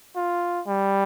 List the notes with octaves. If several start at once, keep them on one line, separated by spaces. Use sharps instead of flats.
F4
G3